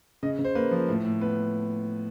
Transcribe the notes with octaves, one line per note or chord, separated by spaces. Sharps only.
C#3 D#5
C#3
C5
A#3 B4
F3
A2
A2
B3 B4